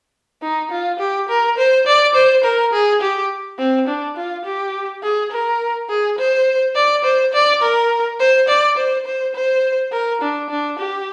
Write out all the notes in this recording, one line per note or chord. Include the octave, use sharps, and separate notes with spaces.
D#4
F4
G4
A#4
C5
D5
C5
A#4
G#4
G4
C4
D4
F4
G4
G#4
A#4
G#4
C5
D5
C5
D5
A#4
C5
D5
C5
C5
C5
A#4
D4
D4
G4